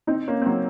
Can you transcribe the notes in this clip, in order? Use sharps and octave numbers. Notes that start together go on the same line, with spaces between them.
C4 D#4
A#3 C#4
C4
F#3 A#3